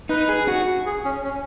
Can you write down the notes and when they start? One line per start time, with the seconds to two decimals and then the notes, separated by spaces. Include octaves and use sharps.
0.09 D#4 B4
0.29 G#4
0.48 F#4
0.86 G#4
1.04 C#4
1.24 C#4